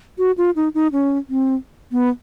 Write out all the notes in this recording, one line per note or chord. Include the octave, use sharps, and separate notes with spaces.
F#4
F4
D#4
D#4
C#4
C4
B3